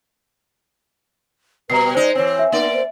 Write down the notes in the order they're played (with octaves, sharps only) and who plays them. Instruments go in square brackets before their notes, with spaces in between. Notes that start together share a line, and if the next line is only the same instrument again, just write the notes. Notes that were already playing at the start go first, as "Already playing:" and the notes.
[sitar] B2 G3 [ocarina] B4 [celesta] A#5 C7
[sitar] G#3 D#4 [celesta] C5 [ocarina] D5
[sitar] E3 C4 [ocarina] C#5
[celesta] E5
[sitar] A#3 D5 [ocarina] D#4
[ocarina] C5